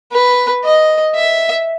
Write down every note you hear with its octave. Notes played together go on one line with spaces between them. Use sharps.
B4
D#5
E5